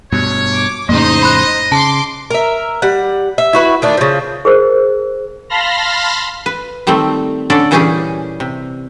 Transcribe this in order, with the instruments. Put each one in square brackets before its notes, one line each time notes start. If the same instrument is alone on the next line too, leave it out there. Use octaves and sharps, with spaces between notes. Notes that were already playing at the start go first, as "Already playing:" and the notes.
[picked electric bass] G2 B2 [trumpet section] C#5
[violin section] D6
[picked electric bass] F2 A2 C#3 [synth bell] A#3 [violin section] D#4 C5 [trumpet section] D#5
[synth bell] B5 C6 F#6
[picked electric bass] C#3 [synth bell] A5 [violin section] C6 D6
[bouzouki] A#4 E5
G3 F#5
E5
E4 F#4 B4
D#3 A3 D4
C#3 F3
[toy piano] G#4 A#4 C5 E6
[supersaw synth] F5 A5 B5 C6 F6 A#6
[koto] B4
D#3 G3 A3 C4
D3 C#4 A4 D5
A#2 E3 G3 C#4 G4 G#4
C3